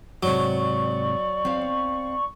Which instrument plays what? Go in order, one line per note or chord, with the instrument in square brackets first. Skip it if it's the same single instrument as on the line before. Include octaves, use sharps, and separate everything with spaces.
[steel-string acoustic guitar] G#2 C3 [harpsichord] F#3 [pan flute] D5 [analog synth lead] C#6
[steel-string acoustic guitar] C4 F5